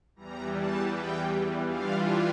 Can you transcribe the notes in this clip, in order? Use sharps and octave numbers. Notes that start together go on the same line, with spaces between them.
E2 E3 G3 A#5
A5
G5
E3 G3 D4 F4 F5